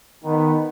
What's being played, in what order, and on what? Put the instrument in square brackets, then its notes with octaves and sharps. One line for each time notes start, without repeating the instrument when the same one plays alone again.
[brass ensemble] D#3 B3